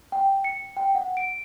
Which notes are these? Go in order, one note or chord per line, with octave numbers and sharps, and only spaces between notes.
G5
C#7
G5
F#5
D7